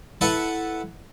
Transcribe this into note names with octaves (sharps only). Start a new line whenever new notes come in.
E4 A4 B4 E5 F#5